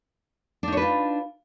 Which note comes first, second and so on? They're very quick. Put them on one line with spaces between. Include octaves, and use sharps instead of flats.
D4 D#4 C#5 B4 F4